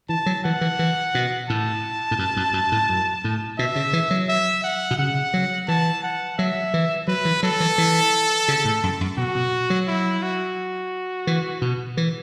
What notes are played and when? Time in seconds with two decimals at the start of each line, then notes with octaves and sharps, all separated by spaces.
0.09 E3 A5
0.26 F#3
0.44 E3 F#5
0.61 E3
0.79 E3
1.15 B2
1.49 A2 A5
2.11 A2
2.19 F#2
2.37 F#2
2.53 F#2
2.72 A2
2.89 F#2
3.24 A2
3.58 B2 E5
3.76 C#3
3.93 E3
4.11 F#3
4.28 E5
4.64 F#5
4.91 B2
4.98 C#3 F#5
5.34 F#3
5.68 E3 A5
6.03 F#5
6.38 F#3 E5
6.74 E3
7.08 F#3 B4
7.25 E3
7.43 F#3 A4
7.60 E3
7.78 E3
8.48 C#3
8.65 A2
8.83 F#2
9.01 F#2
9.17 B2 F#4
9.35 B2
9.70 F#3
9.88 E4
10.22 F#4
11.27 E3
11.62 B2
11.97 E3